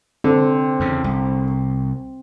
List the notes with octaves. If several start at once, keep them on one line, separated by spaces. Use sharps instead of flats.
D3 C4
E2 C#3
C2